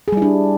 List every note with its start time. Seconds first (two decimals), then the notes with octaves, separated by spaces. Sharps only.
0.08 G#4
0.12 G3
0.17 E4
0.22 D4